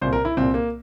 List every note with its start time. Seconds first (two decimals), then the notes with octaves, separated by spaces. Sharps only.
0.01 C2 A#2 C5
0.13 A#4
0.25 E4
0.37 C2 A#2 C4
0.54 A#3